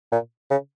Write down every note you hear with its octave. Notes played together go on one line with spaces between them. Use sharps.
A#2
C#3